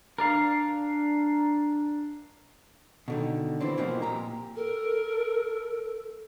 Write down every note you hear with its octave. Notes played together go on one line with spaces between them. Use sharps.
D4 A#4 D5 F5
B2 D3 D#3
E3 C4 D4
G#2 B2 E3 F3 A#3 C4
A#2 G4 A#5
A4 A#4